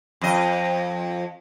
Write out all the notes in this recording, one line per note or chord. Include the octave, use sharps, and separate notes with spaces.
F2 D#5